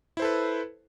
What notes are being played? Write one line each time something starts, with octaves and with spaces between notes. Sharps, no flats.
E4 A4 B4 C5